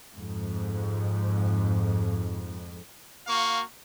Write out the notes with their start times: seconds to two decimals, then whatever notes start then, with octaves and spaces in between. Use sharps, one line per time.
0.14 F2 G#2
3.28 A#3 F#4 F5 C#6